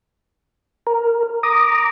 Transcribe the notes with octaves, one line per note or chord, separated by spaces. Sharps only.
A#4
A#5 D6 D#6